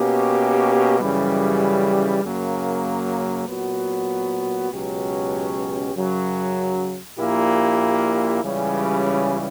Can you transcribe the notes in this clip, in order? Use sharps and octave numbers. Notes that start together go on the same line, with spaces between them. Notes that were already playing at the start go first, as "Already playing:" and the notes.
Already playing: B2 A#3 C#4 G4
F#2 C#3 E3 G3
F#2 C#3 F#3 A#3
A#2 F#3 B3 F#4
C#2 B2 F#3 C#4 G4
F#2 C#3 F#3
A#1 A#2 A#3 E4 G4
C#2 C#3 E3 G3 C#4